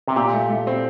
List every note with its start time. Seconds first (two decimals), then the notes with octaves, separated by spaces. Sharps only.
0.08 C3
0.16 A#2 G4
0.33 A3
0.50 A3
0.67 C4